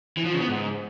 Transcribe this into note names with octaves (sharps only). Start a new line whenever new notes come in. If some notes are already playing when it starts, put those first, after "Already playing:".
E3
F3
C#3
B3
G#2